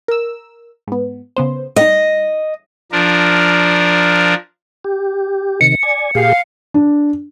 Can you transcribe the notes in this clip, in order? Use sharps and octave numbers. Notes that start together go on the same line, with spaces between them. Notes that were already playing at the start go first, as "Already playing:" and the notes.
A#4 E6
G#2 B3
C#3 B3 C5
G3 D#4 D#5
F3 D4 A#4
G4
C3 D#3 C#7
D5 G#5
A#2 G4 G#4 F5
D4